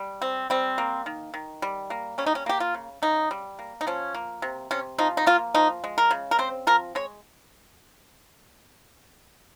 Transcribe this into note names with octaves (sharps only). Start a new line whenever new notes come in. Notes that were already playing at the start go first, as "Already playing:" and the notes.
Already playing: G3
C4
G3 C4
A#3
D#3
D#3
G3
A#3
G3 C#4
D#4
C#4
A#3 G4
F4
C#3
C#3 D#4
G3
A#3
D#4
F3 C#4
A#3
C3
C3 C#4
F3 D#4
D#4
A#3 F4
F3 D#4
G#3
A#4
C#3
A#4
C4 C5
F3 A#4
G#3 C#5